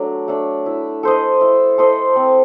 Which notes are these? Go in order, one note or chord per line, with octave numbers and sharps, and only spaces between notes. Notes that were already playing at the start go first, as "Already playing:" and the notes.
Already playing: F#3 A3 D4
A3 D4
E4
A4 C5 D#5
E4
A4 C5 D#5
C4